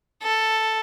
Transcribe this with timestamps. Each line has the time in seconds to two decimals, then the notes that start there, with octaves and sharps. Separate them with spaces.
0.22 A4